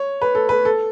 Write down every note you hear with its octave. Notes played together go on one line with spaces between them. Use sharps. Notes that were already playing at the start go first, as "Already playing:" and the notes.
Already playing: C#5
B4
A4
B4
A4